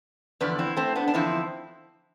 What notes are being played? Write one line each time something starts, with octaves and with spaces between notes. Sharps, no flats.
E2 D3 F3 B4 D5
C4 E4
A3 C4
B3 D4
D4
E2 D3 F3 C4 E4